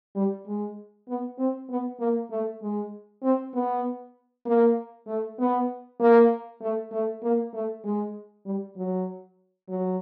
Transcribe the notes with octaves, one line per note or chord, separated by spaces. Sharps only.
G3
G#3
B3
C4
B3
A#3
A3
G#3
C4
B3
A#3
A3
B3
A#3
A3
A3
A#3
A3
G#3
G3
F#3
F#3